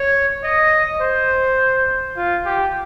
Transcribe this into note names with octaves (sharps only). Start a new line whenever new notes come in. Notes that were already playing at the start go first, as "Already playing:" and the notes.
Already playing: C#5
D#5
C5
F4
G4